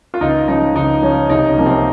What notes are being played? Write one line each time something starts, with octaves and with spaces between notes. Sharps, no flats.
F4
C#2 D#4
C#3 F3 D#4
C#2 D#4
C#3 F3 C#4
C2 D#4
C#4
C3 F3 A#3
C4